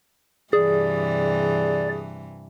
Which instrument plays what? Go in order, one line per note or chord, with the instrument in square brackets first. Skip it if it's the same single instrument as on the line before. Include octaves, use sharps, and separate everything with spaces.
[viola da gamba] G2 C3 E3 [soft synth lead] G#4 [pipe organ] D5